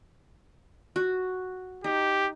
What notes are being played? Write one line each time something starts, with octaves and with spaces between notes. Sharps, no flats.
F#4
D#4 G4